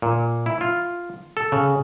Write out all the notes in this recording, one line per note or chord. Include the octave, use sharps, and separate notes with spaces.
A#2
E4
F4
A4
C#3